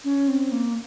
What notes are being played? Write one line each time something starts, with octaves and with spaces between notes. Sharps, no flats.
C#4
C4
A#3